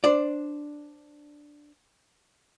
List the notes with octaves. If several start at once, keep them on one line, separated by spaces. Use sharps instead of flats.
D4 C5 D5